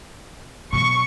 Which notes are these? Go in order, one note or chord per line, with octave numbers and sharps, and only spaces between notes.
B2 F#3 C#6